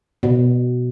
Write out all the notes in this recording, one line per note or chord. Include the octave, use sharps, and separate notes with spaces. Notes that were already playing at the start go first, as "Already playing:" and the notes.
B2